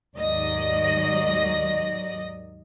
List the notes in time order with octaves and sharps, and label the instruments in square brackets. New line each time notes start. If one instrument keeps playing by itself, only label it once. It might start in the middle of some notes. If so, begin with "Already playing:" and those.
[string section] D#2 G#2 F#3 D5 D#5 A#6